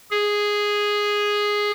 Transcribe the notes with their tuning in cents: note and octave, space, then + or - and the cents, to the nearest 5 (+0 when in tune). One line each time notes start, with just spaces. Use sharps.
G#4 -5